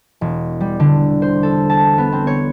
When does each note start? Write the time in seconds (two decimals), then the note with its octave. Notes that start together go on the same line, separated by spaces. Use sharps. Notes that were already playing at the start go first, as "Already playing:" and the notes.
0.21 E1
0.61 G3
0.80 D3
1.22 C5
1.43 A4
1.70 A5
1.98 B3
2.12 C4
2.27 C#5